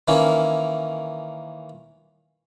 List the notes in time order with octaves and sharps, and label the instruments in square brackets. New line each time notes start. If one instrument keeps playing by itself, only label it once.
[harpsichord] D#3 E3 A#3 C#4 E4